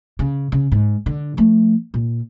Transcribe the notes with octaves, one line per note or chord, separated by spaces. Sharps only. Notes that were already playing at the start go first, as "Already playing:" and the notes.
C#3
C#3
G#2
D3
F3 A3
A#2